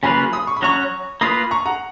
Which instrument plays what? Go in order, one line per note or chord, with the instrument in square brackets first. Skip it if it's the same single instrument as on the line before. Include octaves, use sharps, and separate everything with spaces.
[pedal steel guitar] C#3 F#3 A#3 F4 B4 [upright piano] G#5 B5
[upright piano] B5 D#6
C#6
B5
[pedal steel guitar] F#3 C#4 F#4 C#5 [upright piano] A#5 C#6
[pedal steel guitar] A#3 F4 B4 [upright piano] B5 D#6
[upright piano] A#5 C#6
F#5 A#5